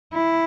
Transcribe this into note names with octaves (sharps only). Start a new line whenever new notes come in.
E4